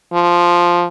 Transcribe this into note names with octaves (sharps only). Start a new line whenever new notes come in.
F3